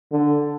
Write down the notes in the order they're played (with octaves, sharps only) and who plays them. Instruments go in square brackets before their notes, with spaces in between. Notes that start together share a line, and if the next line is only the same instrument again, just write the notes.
[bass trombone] D3